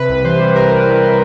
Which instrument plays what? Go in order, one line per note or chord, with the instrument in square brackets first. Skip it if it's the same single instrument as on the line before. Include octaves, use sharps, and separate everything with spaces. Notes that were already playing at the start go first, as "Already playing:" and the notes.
Already playing: [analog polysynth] C3 B4
C2
E3 C5
G3
C3 A#4
C2
E3
G3